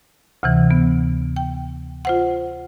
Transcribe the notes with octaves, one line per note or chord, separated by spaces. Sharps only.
D2 C3 E3
B3
G5
F4 C5 F#5